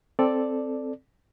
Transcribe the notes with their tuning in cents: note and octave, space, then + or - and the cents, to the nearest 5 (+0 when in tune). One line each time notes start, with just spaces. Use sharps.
C4 +0 A4 +0 D5 +0